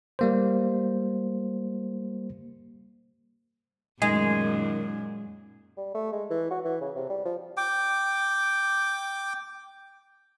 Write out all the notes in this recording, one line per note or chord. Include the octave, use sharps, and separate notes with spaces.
G3 A#3 C5
F#2 A#2 D#3 G#3 G#4
G3
A3
G#3
E3
F#4
E3
C#3
C3
G3
F3
G5 D6